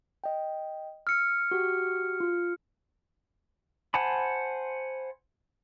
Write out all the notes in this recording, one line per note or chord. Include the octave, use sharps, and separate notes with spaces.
D#5 G5
E6 F6 C#7
F#4 G4
F4
C5 F#5 G#5 A5 B5